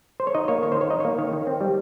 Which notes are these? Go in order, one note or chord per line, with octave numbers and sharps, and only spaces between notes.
C5
C#5
D#4 D#5
A#3 C#5
D#3 C#5
C5
D#3 C#5
D#4 D#5
C#5
A#3
D#3 C#5
D#3
C4
G3